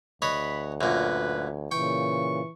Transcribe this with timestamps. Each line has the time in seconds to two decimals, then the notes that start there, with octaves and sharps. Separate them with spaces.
0.22 D2 B4 C#5 D#5 B5
0.81 F#2 A#2 B4
1.71 A#2 C#3 E3 G5 C#6